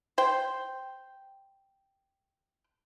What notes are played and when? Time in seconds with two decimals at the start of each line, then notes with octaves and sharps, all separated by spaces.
0.18 C5 G5